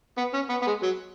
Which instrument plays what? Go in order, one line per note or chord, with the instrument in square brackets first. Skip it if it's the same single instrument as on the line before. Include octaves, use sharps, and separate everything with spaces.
[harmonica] B3
C#4
B3
B3
G#3
F#3